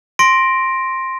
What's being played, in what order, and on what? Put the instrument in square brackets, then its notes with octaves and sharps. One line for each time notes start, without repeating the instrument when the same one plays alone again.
[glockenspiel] C6 A#6 D7